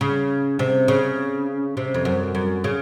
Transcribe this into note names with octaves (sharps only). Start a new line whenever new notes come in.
C#3
C3
C#3
C3
F2
F#2
F#2
C#3